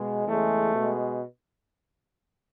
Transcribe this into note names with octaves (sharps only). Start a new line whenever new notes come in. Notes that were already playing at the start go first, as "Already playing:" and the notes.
Already playing: B2 G#3
E2 C#3 G#3 A3
B2 G#3